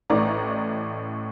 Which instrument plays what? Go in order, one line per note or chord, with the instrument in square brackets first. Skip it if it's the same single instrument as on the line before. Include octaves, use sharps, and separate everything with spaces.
[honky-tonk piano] A1 A2 D5 A#5